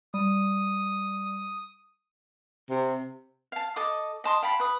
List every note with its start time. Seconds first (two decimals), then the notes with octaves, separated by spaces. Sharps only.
0.14 G3 D#6
2.70 C3
3.52 F5 A5
3.76 A4 D#5 D6
4.24 D#5 A5 C6 D#6
4.42 F5 G5 A5 B5
4.60 B4 D#6